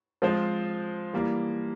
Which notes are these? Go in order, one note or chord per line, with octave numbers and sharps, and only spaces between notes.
F3 G#3 C4 F4 C5
E3 G3 A#3